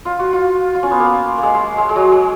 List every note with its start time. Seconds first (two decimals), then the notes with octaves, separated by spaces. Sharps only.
0.05 F4
0.19 F#4
0.33 F4
0.75 F4
0.83 C#4
0.91 B3
1.00 A#3
1.38 A#3
1.43 G#3
1.55 G#3
1.78 G#3
1.89 G#3
1.96 F#3
2.12 G#3